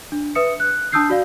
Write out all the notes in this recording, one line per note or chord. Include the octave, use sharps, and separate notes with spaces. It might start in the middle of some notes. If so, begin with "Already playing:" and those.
D4
B4 E5 D#6 C#7
F#6
D4 A5 D#6 E6 G6 C7
F#4 D5 F5